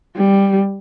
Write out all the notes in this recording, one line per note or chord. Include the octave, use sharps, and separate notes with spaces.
G3